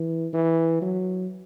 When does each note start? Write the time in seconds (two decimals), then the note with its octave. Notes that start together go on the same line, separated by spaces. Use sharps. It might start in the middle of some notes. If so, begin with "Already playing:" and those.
Already playing: E3
0.33 E3
0.82 F#3